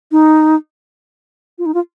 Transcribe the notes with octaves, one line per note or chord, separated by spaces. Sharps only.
D#4
F4
D#4
F4